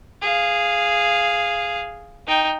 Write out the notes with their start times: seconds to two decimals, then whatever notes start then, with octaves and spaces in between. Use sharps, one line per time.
0.22 G#4 F5
2.27 D#4 G5